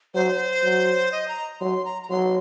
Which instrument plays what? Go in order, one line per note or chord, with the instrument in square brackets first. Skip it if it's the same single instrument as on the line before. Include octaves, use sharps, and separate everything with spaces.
[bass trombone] F#3 [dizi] C5
[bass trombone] F#3
[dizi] D#5
A#5
[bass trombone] F#3 [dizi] C6
[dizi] A#5
A#5
[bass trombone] F#3 [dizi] C6